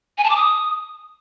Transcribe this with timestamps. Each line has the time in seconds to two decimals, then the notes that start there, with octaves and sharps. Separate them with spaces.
0.18 G#5
0.24 A5
0.30 D6
0.36 D#6